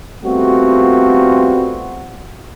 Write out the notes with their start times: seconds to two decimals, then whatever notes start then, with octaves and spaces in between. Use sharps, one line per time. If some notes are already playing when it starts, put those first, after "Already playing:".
0.24 G3 A3 B3 C4 F4 F#4